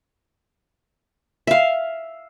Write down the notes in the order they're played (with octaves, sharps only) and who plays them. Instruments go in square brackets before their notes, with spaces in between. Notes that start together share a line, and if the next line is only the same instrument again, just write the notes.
[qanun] E5 F5